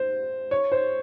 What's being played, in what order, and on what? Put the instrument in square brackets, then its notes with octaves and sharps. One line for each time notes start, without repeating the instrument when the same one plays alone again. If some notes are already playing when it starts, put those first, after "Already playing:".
Already playing: [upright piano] C5
C#5
C5